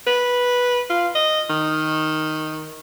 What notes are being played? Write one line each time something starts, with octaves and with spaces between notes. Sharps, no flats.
B4
F4
D#5
D#3